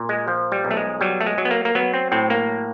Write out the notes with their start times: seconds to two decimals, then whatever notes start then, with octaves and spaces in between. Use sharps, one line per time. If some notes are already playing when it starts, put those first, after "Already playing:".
Already playing: A#2
0.09 G#3
0.28 F3
0.52 G3
0.65 B1
0.71 A3
0.77 G#3
1.01 F#3 G3
1.21 A3
1.26 G#3
1.38 F#3
1.45 B3
1.51 A#3
1.65 A#3
1.75 F#3 B3
1.94 C4
2.12 A2 C4
2.30 A#3